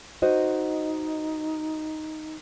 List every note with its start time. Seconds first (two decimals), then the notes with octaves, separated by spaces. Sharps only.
0.22 D#4 F#4 C5 D#5